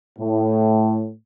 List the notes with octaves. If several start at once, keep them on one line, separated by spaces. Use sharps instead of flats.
A2